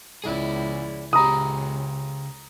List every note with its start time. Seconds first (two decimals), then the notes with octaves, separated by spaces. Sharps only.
0.24 C#2 E4 G#4 D5
1.13 C#2 C#3 G4 A#5 B5 D#6